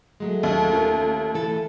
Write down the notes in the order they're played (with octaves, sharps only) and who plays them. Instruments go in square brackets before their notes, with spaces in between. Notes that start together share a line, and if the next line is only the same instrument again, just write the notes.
[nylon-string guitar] F#3 G#3 [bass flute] A3
[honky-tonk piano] D#2
[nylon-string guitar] C#4 F4 A#4
E3 A4